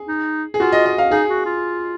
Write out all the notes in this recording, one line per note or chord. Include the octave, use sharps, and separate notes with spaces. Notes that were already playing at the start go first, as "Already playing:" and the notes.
Already playing: G#4
D#4
G#4
F4 F#4
D#5
D#5
F5
D#4 G#4
F#4
F4